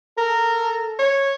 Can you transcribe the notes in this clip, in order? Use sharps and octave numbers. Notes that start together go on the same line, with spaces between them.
A4 A#4
C#5